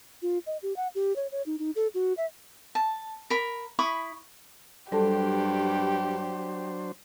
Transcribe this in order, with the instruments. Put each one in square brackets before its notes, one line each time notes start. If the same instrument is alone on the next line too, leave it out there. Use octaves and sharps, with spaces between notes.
[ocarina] F4
D#5
G4
F#5
G4
C#5
C#5
D#4
D#4
A4
F#4
E5
[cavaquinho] A5
A#4 A#5 B5
E4 B5 C#6 D#6
[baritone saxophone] G2 [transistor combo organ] F#3 D4 C5 [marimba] G3 A4 A5 [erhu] G4